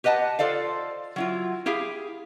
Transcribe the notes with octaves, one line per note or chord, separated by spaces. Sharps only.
G4 B4 D#5 F#5 A5
F4 A4 C5 D5 F5
F#3 E4 F4
E4 G4 G#4 F5